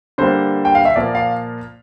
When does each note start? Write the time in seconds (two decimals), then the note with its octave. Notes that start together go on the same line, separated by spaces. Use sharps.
0.18 D3 G3 A#3 C5
0.65 G5
0.75 F5
0.85 E5
0.96 A#2 F3 A#3 D5
1.15 F5